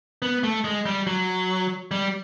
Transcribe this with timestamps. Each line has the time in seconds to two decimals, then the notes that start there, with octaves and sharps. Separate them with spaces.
0.22 B3
0.43 A3
0.64 G#3
0.86 G3
1.07 F#3
1.91 G3